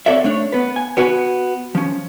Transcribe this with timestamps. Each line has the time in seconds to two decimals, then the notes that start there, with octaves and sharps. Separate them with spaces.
0.06 C4 A4 C#5 D5 E5
0.24 A3 D4 C#5
0.52 B3 B4
0.76 G#5
0.97 B3 F#4 B4 G#5
1.75 F3 C#4